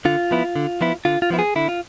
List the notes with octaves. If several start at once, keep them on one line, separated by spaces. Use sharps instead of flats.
D3 F4
F3 B3 E4
D3
F3 B3 E4
D3 F4
F4
F3 B3 E4
G#4
D3 E4
F4